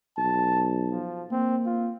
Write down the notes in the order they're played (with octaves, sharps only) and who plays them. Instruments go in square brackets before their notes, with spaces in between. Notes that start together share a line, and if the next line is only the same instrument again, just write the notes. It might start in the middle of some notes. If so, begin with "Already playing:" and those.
[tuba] B1 [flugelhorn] A5
[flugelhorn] F3
[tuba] A#3 [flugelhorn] C4
[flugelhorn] F4